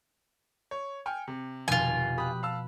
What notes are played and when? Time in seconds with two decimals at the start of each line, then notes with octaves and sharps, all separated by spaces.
0.71 C#5
1.06 G5 G#5 F6 C#7
1.28 C3
1.68 F1 D#2 B2 F4 G#5
2.18 G4 B5 D#6 F#6
2.43 F5 A5 E6